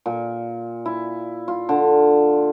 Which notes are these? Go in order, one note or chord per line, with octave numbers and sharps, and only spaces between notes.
A#2
E4
F4
D3